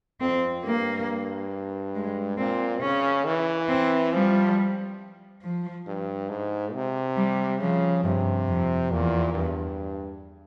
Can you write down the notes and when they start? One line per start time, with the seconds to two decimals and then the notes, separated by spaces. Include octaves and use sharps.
0.20 F2 C4
0.64 G2 A#3
1.95 G#3
2.38 A#2 C4
2.82 C#3 C#4
3.25 E3
3.69 C4
4.13 F3 G3
5.42 F3
5.86 G2
6.30 G#2
6.73 C3
7.17 G3
7.60 C#3 F3
8.04 G2 C3
8.47 F2
8.91 E2 A#2
9.34 G2